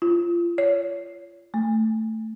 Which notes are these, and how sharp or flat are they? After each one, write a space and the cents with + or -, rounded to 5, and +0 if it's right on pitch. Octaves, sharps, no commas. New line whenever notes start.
F4 -30
C#5 +25
A3 +5